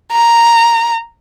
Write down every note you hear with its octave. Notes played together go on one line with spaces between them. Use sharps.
A#5